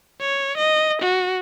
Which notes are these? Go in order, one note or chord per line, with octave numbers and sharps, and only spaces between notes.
C#5
D#5
F#4